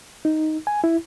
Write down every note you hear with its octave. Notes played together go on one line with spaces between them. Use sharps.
D#4
G#5
E4